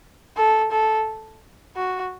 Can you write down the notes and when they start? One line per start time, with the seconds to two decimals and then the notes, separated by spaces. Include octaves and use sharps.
0.37 A4
0.72 A4
1.76 F#4